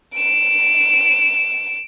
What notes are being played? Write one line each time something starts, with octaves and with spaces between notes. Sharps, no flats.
D7 E7